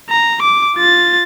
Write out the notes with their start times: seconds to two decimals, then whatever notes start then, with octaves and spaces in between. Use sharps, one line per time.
0.10 A#5
0.42 D6
0.76 F4 A6